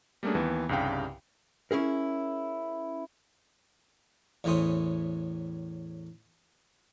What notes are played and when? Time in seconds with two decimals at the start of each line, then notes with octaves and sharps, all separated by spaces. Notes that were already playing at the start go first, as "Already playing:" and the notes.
0.23 G3 A3 A#3 C#4 D4 G#4
0.35 D#2 E3 B3
0.69 C2 G2 C#3 F5 G5
1.71 C#4 E4 G#4 A#4
4.44 E2 A2 E3 C#4 C5 D#6